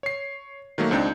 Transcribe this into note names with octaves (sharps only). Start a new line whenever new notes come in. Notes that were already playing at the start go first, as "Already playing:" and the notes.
C#5 C7
D#3 F#3 A3 A#3
C#2 C4 D4 D#4 G6